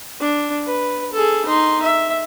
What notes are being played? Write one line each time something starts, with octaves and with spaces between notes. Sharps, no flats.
D4
B4
G#4 A4
D#4 C6
E5